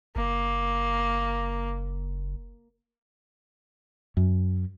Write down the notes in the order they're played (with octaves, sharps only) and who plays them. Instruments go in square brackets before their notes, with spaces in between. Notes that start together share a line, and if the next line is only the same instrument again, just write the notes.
[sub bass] F#1 [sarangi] A#3
[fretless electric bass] F#2